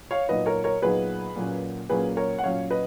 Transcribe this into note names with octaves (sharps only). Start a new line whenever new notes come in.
C#5 F5
A#2 F#3 B3 D#4 B4 D#5
A#4 C#5
A#4 C#5
A#2 F#3 B3 D#4 G#4 B4
A#2 F#3 A#3 C#4
A#2 F#3 A#3 C#4 G#4 B4
A#4 C#5
F#5
A#2 F#3 C#4 C#5 F5
B4 D#5